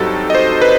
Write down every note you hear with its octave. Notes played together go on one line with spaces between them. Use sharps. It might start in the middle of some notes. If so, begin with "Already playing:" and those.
Already playing: G2 F#3 C4 D#4 F#4 G4 A4
D#5
C5
B4